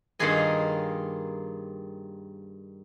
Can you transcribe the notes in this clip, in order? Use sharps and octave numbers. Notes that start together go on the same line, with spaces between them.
G2 D#3 A#3 F4 G#4 D#5